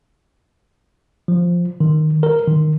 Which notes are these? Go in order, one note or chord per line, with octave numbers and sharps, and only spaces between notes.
F3
D#3
A#4
D#3